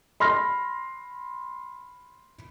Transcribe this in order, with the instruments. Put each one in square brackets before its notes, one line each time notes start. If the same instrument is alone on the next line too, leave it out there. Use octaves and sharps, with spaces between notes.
[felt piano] B5 C6 F6 A#6